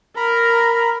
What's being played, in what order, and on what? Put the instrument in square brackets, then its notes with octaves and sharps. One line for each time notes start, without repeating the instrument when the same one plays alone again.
[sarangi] A#4 [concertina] A#5 B5